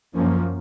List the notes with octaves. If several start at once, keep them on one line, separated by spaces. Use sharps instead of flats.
F#2 F3 A#3 C#4